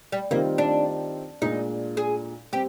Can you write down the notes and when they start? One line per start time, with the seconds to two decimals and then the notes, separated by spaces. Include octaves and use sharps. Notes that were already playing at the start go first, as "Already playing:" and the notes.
0.12 G3
0.30 D#3 G3 A#3 C4 F4
0.58 D4
1.41 A#2 G#3 D4 D#4
1.97 G#4
2.52 G3 C4 G4